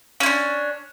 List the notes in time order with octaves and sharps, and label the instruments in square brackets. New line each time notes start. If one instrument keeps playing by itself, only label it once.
[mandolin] C#4
E4
D4